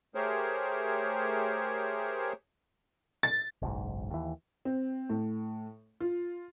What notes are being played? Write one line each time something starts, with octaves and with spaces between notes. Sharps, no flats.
A3 G4 G#4 A#4 C5 C#5
A6
F#1 B1 G#2
D#2 E3
C4
A2
F4